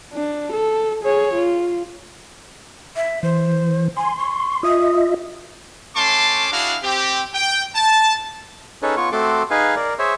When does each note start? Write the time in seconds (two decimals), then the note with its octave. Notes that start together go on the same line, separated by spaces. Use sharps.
0.14 D4
0.53 A4
1.03 G#4 C#5
1.34 F4
2.96 E5
3.23 E3 C5
3.97 G#5 C6
4.18 C#6
4.63 F4 D#5 E5 D#6
5.95 A3 C#4 A5 C6 D6
6.52 D4 E4 F#4 G#4 F5
6.83 C4 G4
7.34 G5
7.75 A5
8.82 C#4 D#4 G#4 A4 B4 C#5
8.97 B3 F4 C#5 C#6
9.12 A3 C4 F#4 A4 C6 D6
9.51 D#4 G#4 B4 F5 G#5
9.76 A#4 D5
9.99 G#4 C5 C#5 E5